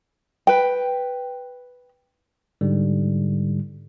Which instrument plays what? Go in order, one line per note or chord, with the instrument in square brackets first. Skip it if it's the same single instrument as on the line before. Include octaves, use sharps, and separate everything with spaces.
[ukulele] B4 G5
[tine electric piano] G#2 D3 G3